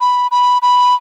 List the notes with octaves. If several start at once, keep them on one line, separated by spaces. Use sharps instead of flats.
B5
B5
B5